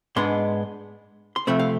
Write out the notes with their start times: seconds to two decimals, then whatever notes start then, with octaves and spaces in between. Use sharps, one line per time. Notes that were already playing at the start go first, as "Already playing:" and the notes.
0.16 G#2 G#3 B3 D4 C6
1.36 C6
1.47 C3 F3 A3 C4 B5
1.59 F5